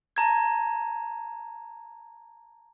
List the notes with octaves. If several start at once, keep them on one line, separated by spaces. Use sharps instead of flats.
A5 A#5 G#6